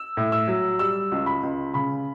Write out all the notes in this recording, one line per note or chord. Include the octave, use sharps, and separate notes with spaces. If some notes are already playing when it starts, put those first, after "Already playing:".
Already playing: E6
A2
E6
F#3
G3 E6
C#2
B5
C#2
C#3 B5